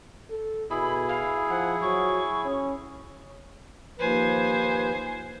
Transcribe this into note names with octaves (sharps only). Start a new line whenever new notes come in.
A4
B2 E4 G#4 B5
F5
F3 F#5
F#3 C#6
C#4
D#2 F3 B4 C5 G#5